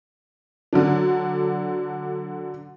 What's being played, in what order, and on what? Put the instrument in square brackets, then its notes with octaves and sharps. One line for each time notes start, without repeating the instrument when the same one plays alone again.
[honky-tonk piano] D3 F#3 D4